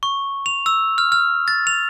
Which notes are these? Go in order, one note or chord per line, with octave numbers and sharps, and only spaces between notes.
C#6
F7
E6
F6
F6
A6
F7